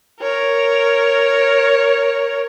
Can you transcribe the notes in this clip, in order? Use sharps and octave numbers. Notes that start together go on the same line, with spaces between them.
A#4 C#5